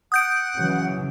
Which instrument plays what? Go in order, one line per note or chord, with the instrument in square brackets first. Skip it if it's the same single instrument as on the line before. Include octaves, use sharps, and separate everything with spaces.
[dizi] F#5 [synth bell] D#6 G6 D7
[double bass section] C#3 E3 F#3